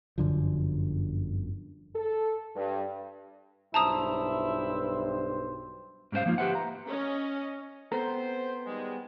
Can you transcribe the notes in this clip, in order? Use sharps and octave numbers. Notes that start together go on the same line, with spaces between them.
G1 F#2 D3 F3
A4
G2
B1 G2 E4 C5 A5 A#5 D#6
G#2 G3 C#4 F#4 C5 F5
F3 A#3 D#4 F4
G4 G#4 B4 C5 E5 F#5
A#5
C#4 D#5
B3 C4 A4 C5 A#5
D#3 G3 G#3